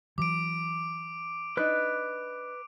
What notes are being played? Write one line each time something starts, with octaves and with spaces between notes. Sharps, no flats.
E3 F#3 D6 D7
D4 D#4 B4 F#6